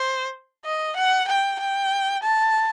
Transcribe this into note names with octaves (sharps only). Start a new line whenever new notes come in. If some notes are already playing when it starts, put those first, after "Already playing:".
Already playing: C5
D#5
F#5
G5
G5
A5